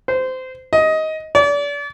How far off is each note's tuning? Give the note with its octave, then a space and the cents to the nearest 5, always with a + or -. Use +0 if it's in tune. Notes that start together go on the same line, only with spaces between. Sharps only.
C5 -20
D#5 +15
D5 -35